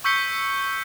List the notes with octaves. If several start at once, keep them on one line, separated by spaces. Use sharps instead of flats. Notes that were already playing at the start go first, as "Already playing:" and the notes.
C#6 E6 G6 B6 C#7 G7